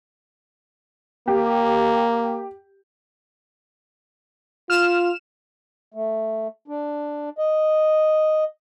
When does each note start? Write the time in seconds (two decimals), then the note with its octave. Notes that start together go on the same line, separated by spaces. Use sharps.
1.28 A#3 G4
4.70 F4 F6 E7
5.94 A3
6.68 D4
7.38 D#5